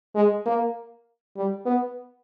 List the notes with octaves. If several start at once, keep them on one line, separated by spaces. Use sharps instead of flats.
G#3
A#3
G3
B3